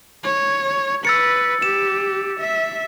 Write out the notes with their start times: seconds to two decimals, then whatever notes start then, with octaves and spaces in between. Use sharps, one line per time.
0.23 C#5
1.05 B4 E6 A6 C#7
1.62 G4 E7
2.40 E5